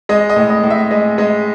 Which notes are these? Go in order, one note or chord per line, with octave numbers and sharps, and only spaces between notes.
G#3 D#5
D#5
A2
D#5
A2
E5
G#3 D#5
G#3 D#5